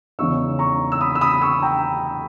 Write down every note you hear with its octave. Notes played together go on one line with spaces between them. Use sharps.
E2 C#3 G#3 D#4 C#6 E6
A#5 C#6
E6
B5 D#6
E6
B5 D#6
C#6 E6
G5 A#5